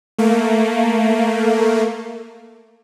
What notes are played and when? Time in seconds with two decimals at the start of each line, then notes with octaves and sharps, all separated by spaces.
0.19 A3 A#3